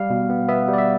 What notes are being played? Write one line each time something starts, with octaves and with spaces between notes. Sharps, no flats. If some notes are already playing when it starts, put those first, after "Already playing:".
Already playing: G3 F5
B2
B3
B3 E5
G3
D5
E5